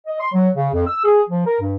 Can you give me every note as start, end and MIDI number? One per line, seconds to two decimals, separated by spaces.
0.07 0.19 75
0.20 0.31 84
0.33 0.48 54
0.55 0.68 49
0.73 0.83 41
0.86 1.03 88
1.04 1.21 68
1.29 1.43 53
1.45 1.59 70
1.60 1.74 43